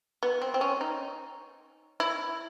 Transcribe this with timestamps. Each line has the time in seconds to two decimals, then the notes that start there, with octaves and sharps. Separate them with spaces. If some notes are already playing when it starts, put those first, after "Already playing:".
0.23 B3
0.42 C4
0.54 C4
0.61 C#4
0.81 D#4
2.00 E4